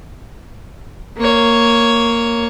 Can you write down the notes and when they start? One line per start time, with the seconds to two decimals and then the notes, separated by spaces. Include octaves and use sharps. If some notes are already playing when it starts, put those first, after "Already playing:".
1.18 A#3 C#5